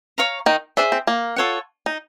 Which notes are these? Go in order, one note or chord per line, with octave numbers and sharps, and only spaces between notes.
C#5 F5 A#5 C#6
D#3 D#4
D4 G#4 C5 E5
C4
A#3
F4 A4 C#5 F#5
D#4